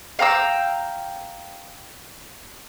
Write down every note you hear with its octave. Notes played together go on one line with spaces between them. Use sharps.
F5 G5 A#5 E6